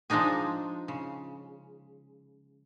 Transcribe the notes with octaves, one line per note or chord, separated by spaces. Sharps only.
F3 G#3 D4 D#4 G#4
C#3